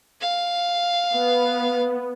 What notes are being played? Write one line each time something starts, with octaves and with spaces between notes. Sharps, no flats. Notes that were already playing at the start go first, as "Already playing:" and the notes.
F5
B3